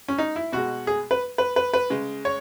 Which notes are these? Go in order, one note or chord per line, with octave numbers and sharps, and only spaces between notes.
C#4
D#4
E4
B2 G#3 F#4
G#4
B4
B4
B4
B4
C#3 G#3
C#5